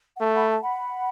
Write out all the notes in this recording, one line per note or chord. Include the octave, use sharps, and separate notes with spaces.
F#5
A3 E5 A5
F#5 B5
E5 A5
F#5 B5